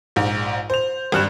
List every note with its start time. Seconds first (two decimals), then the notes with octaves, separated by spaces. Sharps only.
0.16 A#1 G#2
0.70 C5 F7
1.12 G#1 G2 F#6 E7